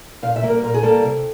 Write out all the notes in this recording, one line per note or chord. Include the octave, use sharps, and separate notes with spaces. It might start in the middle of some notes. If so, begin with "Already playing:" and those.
A#2 F5
E5
G3 A#3
A#4
A#2 A#4
G#4
G3 A#3 A4
C3